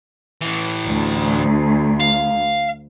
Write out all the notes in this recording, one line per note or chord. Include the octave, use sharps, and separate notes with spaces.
A2 E3
D2
F5